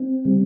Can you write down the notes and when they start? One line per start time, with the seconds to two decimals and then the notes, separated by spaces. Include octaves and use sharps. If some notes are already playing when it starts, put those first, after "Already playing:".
Already playing: C4
0.25 C#3 G3